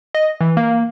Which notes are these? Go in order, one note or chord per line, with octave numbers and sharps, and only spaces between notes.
D#5
E3
A#3